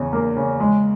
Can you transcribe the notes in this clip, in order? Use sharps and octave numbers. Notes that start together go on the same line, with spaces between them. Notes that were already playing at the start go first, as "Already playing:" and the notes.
Already playing: E2 C#3
A#3
C#3
G#3